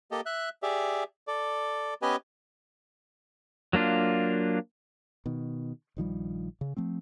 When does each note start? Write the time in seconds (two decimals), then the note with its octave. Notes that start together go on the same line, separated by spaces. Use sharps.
0.11 A#3 G4 A4 D#5
0.26 E5 F#6
0.63 G4 G#4 D5 E5
1.27 A4 D5
2.02 B3 C#4 G4 B4 D#5 G#5
3.73 F#3 A#3 D4 F4
5.26 B2 D#3
5.97 A#1 D#3 F3 G3
6.61 C#3
6.77 F3 A3 C4